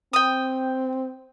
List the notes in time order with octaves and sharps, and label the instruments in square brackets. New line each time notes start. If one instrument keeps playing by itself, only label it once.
[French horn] C4 [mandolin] G5 D#6